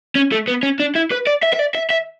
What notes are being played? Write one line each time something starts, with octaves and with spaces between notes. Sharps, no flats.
C#4
A3
B3
C#4
D4
E4
B4
D5
E5
E5
D5
E5
E5